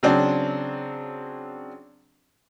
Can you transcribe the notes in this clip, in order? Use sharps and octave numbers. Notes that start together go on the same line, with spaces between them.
C#3 F#3 C4 D4